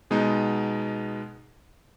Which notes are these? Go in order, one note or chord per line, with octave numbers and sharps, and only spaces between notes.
B2 G#3 B3 D#4